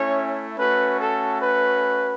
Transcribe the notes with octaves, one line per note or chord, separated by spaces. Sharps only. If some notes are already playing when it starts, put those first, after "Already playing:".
Already playing: A3 C#4 E4 C#5
A3 C#4 F#4 B4
A4
B4